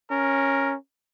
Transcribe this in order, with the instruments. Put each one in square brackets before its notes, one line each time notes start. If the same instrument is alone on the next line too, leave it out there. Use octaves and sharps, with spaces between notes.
[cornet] C#4 [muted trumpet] A#4